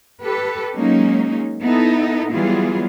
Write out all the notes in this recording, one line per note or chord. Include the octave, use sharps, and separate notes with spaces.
G4 A4 B4
F#3 G#3 A#3 C#4 D#4
B3 D#4 E4 A4
E3 F#3 G3 B3 F4 G#4